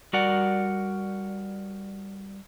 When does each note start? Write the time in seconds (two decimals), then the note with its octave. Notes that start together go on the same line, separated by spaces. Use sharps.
0.13 G3 F#4 A#4 D5 F#5